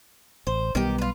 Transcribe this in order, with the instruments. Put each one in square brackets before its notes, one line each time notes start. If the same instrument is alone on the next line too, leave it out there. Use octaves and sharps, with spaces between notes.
[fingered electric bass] A1 [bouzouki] C5
[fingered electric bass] B1 G3 B3 [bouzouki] D#3 G4
[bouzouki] F4 B4